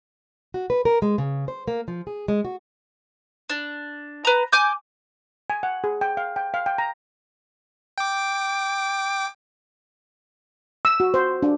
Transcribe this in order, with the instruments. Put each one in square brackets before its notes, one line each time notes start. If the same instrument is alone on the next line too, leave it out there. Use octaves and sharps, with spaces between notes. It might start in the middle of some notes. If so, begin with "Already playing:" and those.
[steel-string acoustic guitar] F#4
B4
A#4
G#3
C#3
C5
A#3
F3
G#4
G#3
F#4
[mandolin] D4
B4 A#5
G#5 D6 G6
[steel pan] G#5
F#5
G#4
G5
F5
G5
F5
G5
A#5
[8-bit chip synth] G5 D6
[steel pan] E6
F#4
C5
D4